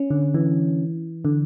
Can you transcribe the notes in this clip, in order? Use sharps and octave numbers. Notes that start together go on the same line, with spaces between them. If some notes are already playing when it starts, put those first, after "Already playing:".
Already playing: C#4
D3
E3
D3